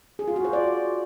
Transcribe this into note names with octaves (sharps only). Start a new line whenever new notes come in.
G#4
F4
F#4
C5
D5